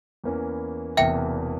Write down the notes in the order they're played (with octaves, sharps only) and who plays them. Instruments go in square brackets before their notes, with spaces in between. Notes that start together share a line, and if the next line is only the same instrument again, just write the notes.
[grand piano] E2 E3 A#3 C#4
[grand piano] E1 E2 C3 E3 A#3 [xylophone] E5 G5